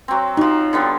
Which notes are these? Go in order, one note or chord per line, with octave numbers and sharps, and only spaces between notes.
F#3 C4
F3 F#3 D#4
D3 G3 B3